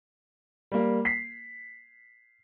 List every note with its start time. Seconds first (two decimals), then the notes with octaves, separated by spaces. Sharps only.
0.72 G3 A#3
1.05 B6 C7